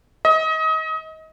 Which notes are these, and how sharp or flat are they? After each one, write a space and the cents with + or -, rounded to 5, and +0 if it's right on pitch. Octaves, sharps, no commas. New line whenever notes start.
D#5 +30